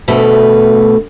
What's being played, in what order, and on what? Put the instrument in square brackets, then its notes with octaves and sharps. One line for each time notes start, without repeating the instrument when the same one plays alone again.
[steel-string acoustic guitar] D2 B2 A3 B4